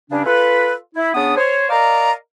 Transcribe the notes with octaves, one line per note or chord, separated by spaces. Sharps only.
G2 C#3 C#4 D4
F4 A4 B4
E4
C#3 B3 D4 D#6
C5 C#5
A#4 D5 D#5 F5 A#5